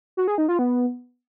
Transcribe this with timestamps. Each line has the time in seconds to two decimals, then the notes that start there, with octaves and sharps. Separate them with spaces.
0.17 F#4
0.28 G#4
0.38 D#4
0.48 F4
0.59 B3